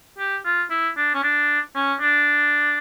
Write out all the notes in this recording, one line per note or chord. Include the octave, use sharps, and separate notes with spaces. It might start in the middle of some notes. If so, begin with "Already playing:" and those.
G4
F4
E4
D4
C#4
D4
C#4
D4